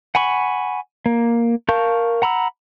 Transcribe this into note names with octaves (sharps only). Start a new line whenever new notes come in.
F#5 G#5 B5 C#6
A#3
A#4 F5 A5 C#6 G6
F#5 A#5 B5 E6